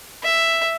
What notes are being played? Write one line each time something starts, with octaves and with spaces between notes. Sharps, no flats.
E5